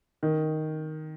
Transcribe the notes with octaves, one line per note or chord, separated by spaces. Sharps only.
D#3